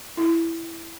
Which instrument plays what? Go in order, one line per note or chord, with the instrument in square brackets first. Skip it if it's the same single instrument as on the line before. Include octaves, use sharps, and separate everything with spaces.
[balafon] E4